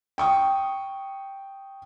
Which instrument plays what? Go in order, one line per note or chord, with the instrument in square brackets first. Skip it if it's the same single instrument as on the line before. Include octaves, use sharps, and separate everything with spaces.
[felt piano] G5 C#6 D#6